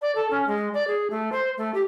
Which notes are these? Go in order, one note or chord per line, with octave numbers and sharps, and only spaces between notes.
D5
A4
C#4
G#3
D5
G#4
A3
C5
A3
G4